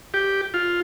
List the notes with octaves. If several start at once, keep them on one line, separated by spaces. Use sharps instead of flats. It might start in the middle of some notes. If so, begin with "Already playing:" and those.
G4
F4